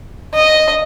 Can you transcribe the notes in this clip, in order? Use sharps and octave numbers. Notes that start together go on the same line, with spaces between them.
D#5